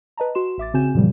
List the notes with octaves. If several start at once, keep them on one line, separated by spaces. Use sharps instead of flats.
B4 D#5 A5 A#5
F#4 C6 E7
A1 E5 D6 A6
C#3 C4 F#4 G#5 G6 E7
F#2 A#2 C#3 E3 F3 G3